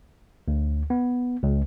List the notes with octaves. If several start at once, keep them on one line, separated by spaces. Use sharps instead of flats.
D2
B3
C#2